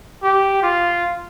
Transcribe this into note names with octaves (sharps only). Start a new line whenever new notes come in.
G4
F4